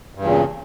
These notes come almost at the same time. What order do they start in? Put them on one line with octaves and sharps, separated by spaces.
G2 E2 A#2 C#3